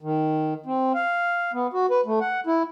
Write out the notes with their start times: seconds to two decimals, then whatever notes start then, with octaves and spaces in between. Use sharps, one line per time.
0.01 D#3
0.66 C4
0.94 F5
1.53 B3
1.73 F#4
1.91 B4
2.06 A3
2.21 F#5
2.47 E4